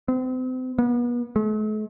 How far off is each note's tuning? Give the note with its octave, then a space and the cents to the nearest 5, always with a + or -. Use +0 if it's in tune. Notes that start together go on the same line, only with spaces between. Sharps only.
C4 -35
B3 -35
A3 -45